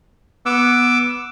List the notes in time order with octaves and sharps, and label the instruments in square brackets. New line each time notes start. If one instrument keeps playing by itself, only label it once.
[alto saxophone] B3 [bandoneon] D6 E6